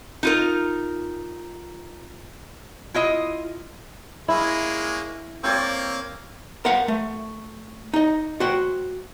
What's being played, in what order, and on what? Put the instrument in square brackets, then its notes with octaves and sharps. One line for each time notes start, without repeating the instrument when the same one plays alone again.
[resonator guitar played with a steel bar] D#4 F4 A#4
E4 F4 D#5
[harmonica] G#3 A#3 C#4 [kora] E4
[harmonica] A#3 F5 [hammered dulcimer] C4 C#5 D5
[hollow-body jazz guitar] A#4 C5 F5 F#5
A3
D#4 D#5
F#4 C5 G5